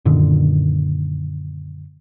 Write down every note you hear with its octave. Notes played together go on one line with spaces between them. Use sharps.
F#2 A#2 D3 D#3